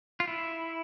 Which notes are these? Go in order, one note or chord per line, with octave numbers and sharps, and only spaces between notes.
F4
E4